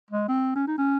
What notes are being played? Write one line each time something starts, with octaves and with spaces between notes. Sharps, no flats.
G#3
C4
C#4
D#4
C#4